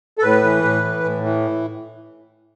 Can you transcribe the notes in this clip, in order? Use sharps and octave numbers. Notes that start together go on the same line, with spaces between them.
A4
A2 B4
E3
A2
E3
A2
E3